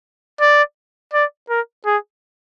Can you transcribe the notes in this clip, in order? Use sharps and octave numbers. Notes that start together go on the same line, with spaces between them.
D5
D5
A#4
G#4